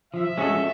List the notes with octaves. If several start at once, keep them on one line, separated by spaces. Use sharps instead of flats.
F3 E5
G#3 C#4 F#4 A4